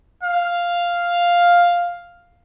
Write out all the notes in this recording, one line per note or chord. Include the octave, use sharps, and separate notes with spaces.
F5